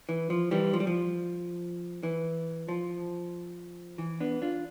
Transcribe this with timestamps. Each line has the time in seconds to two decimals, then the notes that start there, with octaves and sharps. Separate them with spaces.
0.09 E3
0.30 F3
0.51 E3 G3
0.73 F3
0.80 G3
0.87 F3
2.03 E3
2.69 F3
3.98 E3
4.20 B3 D4
4.42 D4 F4